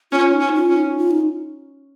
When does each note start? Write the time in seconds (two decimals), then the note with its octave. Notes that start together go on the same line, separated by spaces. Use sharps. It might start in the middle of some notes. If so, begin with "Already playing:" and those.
0.12 C#4 F4
0.34 D#4
0.40 C#4
0.55 F4
0.69 C#4
0.76 D#4
0.98 F4
1.11 D#4